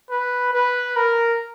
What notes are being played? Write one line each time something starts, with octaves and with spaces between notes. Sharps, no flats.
B4
B4
A#4